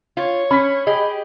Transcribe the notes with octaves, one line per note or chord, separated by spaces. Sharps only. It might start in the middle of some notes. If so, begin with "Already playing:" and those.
F4 C#5
C#4 B5 B6
G4 G#4 D#5